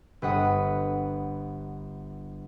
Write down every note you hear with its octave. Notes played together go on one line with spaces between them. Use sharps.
G1 B4 F#5 D#6